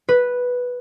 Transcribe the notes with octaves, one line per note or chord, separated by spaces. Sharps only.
B4